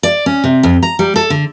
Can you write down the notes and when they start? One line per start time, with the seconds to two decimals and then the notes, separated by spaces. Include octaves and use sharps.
0.03 D5
0.26 C#4
0.44 C3
0.63 F2
0.83 A#5
0.99 G3
1.16 A4
1.30 D3